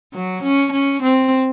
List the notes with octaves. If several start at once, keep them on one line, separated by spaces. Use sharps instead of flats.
F#3
C#4
C#4
C4